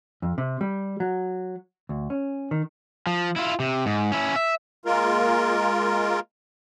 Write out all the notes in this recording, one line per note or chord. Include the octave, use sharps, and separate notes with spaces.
F2
C3
G3
F#3
D2
C#4
D#3
F3
E4 F4
C3
G#2
C#4 E4
E5
G#3 A#3 F4 A#4